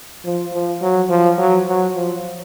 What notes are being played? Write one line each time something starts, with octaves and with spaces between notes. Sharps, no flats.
F3
F3
F#3
F3
F#3
F#3
F3